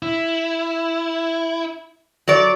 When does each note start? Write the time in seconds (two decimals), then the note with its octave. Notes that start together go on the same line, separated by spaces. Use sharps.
0.03 E4
2.28 F#3 D5